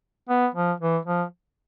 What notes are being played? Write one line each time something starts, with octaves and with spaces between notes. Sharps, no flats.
B3
F3
E3
F3